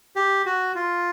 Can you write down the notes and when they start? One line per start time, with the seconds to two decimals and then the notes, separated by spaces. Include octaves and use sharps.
0.16 G4
0.46 F#4
0.75 F4